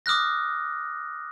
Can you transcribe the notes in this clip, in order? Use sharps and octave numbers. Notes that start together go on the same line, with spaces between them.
D6 D#6 F6 F#6 A#6